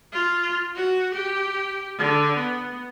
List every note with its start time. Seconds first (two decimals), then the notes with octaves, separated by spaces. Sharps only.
0.13 F4
0.75 F#4
1.14 G4
1.98 D3
2.37 B3